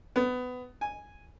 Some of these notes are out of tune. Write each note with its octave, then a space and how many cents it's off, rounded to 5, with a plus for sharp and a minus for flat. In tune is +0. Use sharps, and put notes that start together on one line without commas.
B3 +20
G#5 -5